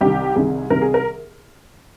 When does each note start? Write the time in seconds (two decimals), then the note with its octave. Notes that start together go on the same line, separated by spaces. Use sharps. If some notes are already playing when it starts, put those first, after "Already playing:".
0.01 C2 C3 D#3 G4
0.35 C2 C3 D#3 G#4
0.70 C2 C3 D#3 A#4
0.82 G#4
0.94 A#4